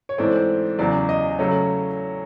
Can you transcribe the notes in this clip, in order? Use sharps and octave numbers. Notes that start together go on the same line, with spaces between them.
C#5
G#2 E3 A3 C4 D5
E2 C#3 F#3 D5
D#5
C#3 F#3 A3 C#4